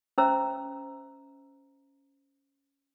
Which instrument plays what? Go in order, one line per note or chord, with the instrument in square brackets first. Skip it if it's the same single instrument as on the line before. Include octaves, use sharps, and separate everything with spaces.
[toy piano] C#4 C5 E5 A#5 E6